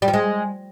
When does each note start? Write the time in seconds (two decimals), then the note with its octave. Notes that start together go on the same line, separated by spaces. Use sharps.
0.02 G3
0.08 F3
0.13 G#3